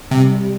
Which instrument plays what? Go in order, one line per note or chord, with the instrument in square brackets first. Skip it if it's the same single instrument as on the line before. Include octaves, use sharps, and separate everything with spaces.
[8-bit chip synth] C3 [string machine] G3